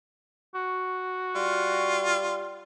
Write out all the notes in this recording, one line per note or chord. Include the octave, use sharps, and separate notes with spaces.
F#4
G3 F4